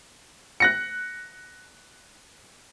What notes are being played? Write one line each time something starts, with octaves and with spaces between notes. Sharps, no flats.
F#6 A#6 C#7